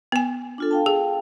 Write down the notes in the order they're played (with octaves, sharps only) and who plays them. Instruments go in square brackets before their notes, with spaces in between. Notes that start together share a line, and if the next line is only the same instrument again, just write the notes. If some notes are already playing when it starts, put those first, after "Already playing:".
[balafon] B3 G#5
[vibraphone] D4 F4 A4
F5 G5 A5
[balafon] G#4